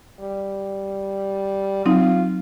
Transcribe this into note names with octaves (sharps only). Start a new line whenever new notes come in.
G3
F#3 C4 D#4 F4